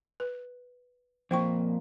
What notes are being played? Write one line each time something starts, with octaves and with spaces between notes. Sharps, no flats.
B4
F2 A#2 A#3 C5 G5 C#6